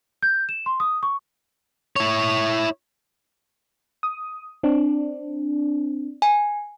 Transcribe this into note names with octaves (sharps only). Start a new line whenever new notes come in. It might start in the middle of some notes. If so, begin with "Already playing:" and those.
G6
E7
C6
D#6
C#6
E4 C#5
D#6
C4 D4
G#5